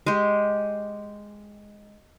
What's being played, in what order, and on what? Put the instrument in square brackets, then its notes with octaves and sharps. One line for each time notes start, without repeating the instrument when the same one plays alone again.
[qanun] G#3 G4